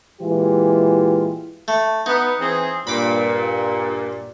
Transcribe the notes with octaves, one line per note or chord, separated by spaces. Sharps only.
A#2 E3 G#3 E4 F4 G4
A3
B3 D#4
E3 C4 G#4
G2 A#2 B5 D6